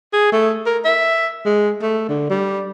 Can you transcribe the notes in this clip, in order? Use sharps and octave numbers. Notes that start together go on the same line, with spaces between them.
G#4
A3
A#4
E5
G#3
A3
D3
G3